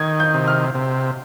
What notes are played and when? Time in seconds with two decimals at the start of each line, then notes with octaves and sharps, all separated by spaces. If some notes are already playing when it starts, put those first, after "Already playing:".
Already playing: D#3 G#6
0.20 G6
0.34 C3
0.48 F6
0.74 C3